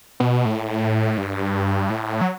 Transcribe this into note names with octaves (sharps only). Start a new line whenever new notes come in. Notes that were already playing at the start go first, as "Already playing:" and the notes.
B2
A2
G2
A2
F#3